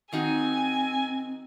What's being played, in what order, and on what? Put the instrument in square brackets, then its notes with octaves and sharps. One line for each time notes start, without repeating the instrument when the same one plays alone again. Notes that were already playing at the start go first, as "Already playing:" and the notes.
[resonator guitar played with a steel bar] D#3 D#4 F#4 [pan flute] C4 [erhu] G#5